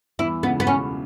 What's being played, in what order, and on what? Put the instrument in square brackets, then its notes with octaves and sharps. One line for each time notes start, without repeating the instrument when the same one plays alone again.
[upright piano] E2 E3 [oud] E4
[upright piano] C#2 C#3 [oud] B3
[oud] B3
[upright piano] B1 B2 [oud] C#4